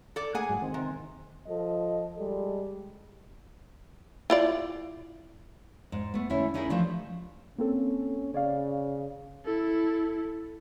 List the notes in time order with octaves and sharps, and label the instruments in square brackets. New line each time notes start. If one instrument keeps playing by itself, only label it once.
[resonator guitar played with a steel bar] A4 D5
[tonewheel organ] A3 A#3 [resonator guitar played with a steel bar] G#4 F#5 G#5
[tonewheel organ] G#2 F#3 G#3
D#3 C4
[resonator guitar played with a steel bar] C3
[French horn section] F3 A4 D#5
G3 G#3 A4
[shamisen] E4 F4 D5
[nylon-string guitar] G#2
A3 B3
D3 A3 C#4 E4
B3 C#4 D#4 E4 G#4 A#4
E3 F3 A3 D4
[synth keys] A#3 C4 A4 [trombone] C#4
[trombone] C#3 [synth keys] C#5 D5 F5
[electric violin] E4 A4